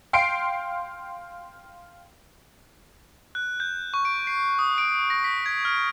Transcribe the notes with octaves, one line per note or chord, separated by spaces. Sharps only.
F5 G5 C6 C7 D7
F#6
G6
C#6
D7
C7
D#6
D7
A#6
B6
G#6
F6